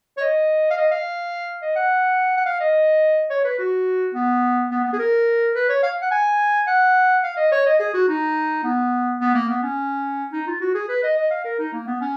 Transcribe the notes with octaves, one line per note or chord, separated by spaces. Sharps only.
C#5
D#5
F5
D#5
F5
D#5
F#5
F#5
F5
D#5
C#5
B4
F#4
B3
B3
B3
G#4
A#4
B4
C#5
F5
F#5
G#5
F#5
F5
D#5
C#5
D#5
G#4
F#4
D#4
B3
B3
A#3
B3
C#4
D#4
F4
F#4
G#4
B4
D#5
D#5
F5
A#4
D#4
A#3
B3
C#4